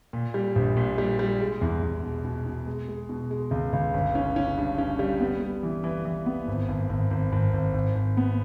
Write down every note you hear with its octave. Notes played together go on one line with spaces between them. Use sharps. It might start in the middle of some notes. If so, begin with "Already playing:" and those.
A#2
G3
A#1
A#2
G3
G3
G#3
E2
E2
B2
B2
B2
G#3
G#3
B2
G#3
C#2
C#2
G1
C#4
C#4
G2
C#4
G3
B3
G3
E3
E3
E3
B3
G#1
G#1
G#1
G#1
G#1
G#1
G#1
G#1
B3